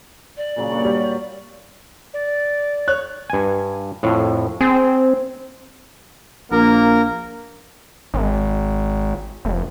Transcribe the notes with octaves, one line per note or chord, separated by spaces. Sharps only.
D5
A#2 C#3 F#3
G2 C#6
F#3 G3
D5
C#5 C#6 F#6
G2 G#5
F2 A2
C4 G#4
A#1 A#3 A#4
G#1
F1